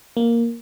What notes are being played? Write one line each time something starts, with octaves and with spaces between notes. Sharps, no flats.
A#3